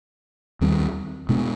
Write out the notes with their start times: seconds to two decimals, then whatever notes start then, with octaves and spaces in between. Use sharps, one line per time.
0.61 D#2 D#3 G3 C4
1.29 B2 G#3 B3 D4